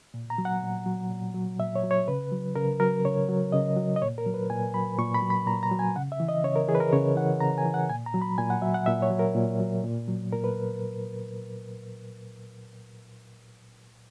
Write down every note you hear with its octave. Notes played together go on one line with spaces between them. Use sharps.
A#2
A#5
F#3
F#5
A#2
F#3
A#2
F#3
A#2 E5
C#5
F#3
C#5
C#3 B4
F#3
C#3 A#4
F#3 A#4
C#3 C#5
F#3
C#3 D#5
F#3
D#5
A#2 C#5
A#4
F#3
B4
A#2 G#5
F#3 B5
A#2 C#6
B5
F#3
B5
A#2 A#5
A#5
F#3
G#5
C#3 F#5
E5
E3
D#5
C#3 C#5
A#4
E3 G#4
B4
A#4
C#3 C#5
E3 F#5
C#3 A#5
G#5
E3
F#5
A#2 G#5
A#5
F#3
B5
A#2 G#5
F#5
F#3 E5
F#5
A#2 E5
C#5
F#3
A#4
A#2
F#3
A#2
F#3
A#2 A#4
B4